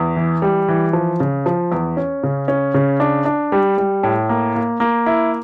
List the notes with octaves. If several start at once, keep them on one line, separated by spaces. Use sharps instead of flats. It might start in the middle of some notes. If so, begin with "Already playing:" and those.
Already playing: E2
E3
G3
E3
F3
C#3
F3
E2
C#4
C#3
C#4
C#3
D4
D4
G3
G3
A2
A#3
A#3
A#3
E4